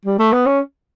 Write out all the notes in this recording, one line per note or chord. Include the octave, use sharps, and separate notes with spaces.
G3
A3
B3
C#4